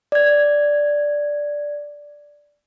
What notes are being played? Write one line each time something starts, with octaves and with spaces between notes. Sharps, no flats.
D5 G#6